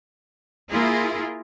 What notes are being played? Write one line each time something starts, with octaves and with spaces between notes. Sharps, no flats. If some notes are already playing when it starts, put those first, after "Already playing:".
A#3 E4 F4 G#4 A#4